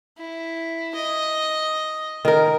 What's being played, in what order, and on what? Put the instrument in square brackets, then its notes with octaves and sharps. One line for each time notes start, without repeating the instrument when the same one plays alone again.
[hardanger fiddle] E4
D#5
[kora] D#3 A#4